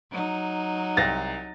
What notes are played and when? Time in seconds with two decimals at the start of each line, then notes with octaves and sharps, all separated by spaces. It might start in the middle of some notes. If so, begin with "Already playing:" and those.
0.12 F#3 D#4
0.97 C2 A6 A#6